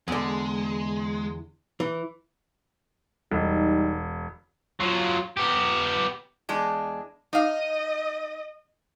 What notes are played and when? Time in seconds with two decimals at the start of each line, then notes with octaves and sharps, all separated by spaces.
0.08 E2 D3 G#3
1.80 E3
3.32 E1 G3 D#4
4.80 F#3 F4
5.37 B3 G4
6.49 E2 G#3 D4
7.33 D#4 D#5 F5